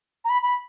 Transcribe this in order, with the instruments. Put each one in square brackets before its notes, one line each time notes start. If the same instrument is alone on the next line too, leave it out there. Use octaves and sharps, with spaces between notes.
[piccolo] A#5
B5
B5